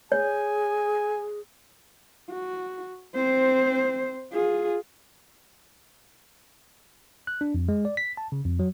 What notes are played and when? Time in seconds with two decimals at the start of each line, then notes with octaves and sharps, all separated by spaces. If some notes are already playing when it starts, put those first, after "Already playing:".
0.12 G#4 C#5 G#5
2.30 F#4
3.15 C4 C5
4.33 F4 G#4
7.27 F#6
7.41 D4
7.55 F2
7.69 G#3
7.85 D5
7.97 B6
8.17 A5
8.32 C#3
8.45 F2
8.59 F#3